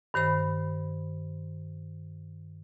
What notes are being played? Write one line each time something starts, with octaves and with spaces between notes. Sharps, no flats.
G2 D#3 C5 B5